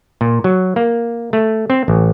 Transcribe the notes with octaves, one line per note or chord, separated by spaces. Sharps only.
A#2
F#3
A#3
A3
C4
A1